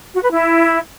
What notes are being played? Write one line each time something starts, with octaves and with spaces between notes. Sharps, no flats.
F#4
B4
E4